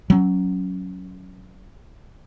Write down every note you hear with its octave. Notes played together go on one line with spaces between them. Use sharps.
F#3 C#4